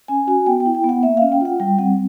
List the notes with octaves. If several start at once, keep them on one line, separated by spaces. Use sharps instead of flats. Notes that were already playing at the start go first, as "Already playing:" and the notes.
C#4 G#5
F#4 G#5
B3 G5
G5
E4
G5
B3 F#5
A#3 E5
C#4 F5
G5
F4 F#5
G3 G5
C4 F#5